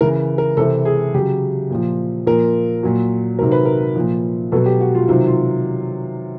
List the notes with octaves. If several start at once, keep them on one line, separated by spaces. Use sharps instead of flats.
C#3 E3 A#4
A#4
C3 E3 A4
G#4
C#3 F#3 G4
A#2 F3
A#2 F3 A#4
A#2 F#3
C3 D#3 F#3 A#4
B4
A#4
A#2 F3
B2 F#3 A4
G4
F#4
F4
C3 D#3 F#3 F4
F4